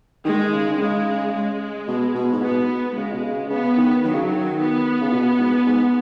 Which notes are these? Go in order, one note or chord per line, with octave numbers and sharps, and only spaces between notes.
D#3 G#3
C#3
D#3
C#3 G#3
G#3
B2
B2
G#2
B2 B3
C#3 G#3
B2
C#3
C#3 B3
D#3
D#3 F#3
C#3
D#3
B3
C#3
B2
G#2
G#2